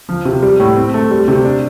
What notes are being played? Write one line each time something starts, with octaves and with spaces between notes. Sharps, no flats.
F3
C3
G3
A2
C4
A3
G3
C3
D4